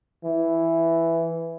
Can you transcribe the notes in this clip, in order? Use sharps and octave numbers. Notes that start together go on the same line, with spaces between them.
E3